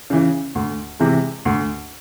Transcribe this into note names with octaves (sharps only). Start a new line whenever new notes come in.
C#3 E3
D2
C3 E3 G#3
D2